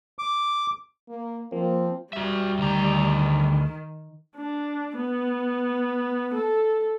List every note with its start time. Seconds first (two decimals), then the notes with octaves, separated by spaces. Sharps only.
0.19 D6
1.09 A#3
1.52 F3 A#3 C4
2.13 G3 F#4 E5
2.59 D2 D#3 A#5
4.36 D4
4.97 B3
6.34 A4